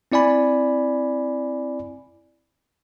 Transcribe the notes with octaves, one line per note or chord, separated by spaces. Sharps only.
C4 E4 D5 G#5 B5